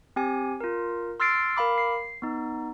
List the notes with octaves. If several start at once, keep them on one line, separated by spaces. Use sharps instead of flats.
C4 G4 G#5
F4 A#4
C6 E6 F6 A6 C7 D7
A#4 F5 B5 D6
C7
B3 D#4